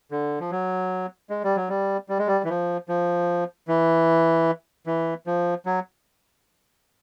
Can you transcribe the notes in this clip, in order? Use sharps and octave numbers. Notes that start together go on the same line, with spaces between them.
D3
F3
F#3
G#3
G3
F#3
G3
G3
G#3
G3
E3
F3
F3
E3
E3
F3
F#3